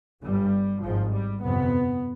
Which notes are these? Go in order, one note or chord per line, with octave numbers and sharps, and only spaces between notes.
G1 G2 G3
G#1 G#2 F3
G3
G1 F2 C3 B3